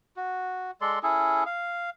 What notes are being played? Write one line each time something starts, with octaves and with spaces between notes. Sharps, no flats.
F#4
G#3 A4 D5 C6
C#4 E4 G#4 A4
F5